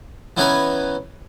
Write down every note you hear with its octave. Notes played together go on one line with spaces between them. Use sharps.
E3 B3 C#4 D#4 B4 G#5